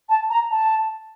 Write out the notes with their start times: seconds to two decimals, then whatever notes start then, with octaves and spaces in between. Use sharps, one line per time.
0.09 A5
0.30 A#5
0.50 A5